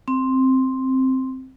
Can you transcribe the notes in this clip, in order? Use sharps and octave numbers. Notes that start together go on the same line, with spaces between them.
C4